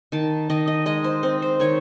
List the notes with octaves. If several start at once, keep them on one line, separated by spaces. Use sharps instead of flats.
D#3 A5
D#3 D#5
D#5
G#3 D#5
C5
C4 C5
C5
D#3 C#5